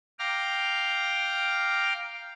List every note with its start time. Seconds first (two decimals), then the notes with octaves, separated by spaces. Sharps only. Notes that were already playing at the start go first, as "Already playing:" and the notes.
0.19 F5 G5 A#5 D6 F6